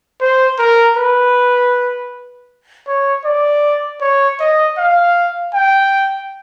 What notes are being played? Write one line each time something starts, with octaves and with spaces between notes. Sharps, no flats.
C5
A#4
B4
C#5
D5
C#5
D#5
F5
G5